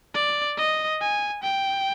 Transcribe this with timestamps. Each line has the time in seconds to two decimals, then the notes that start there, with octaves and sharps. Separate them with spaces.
0.14 D5
0.57 D#5
1.01 G#5
1.43 G5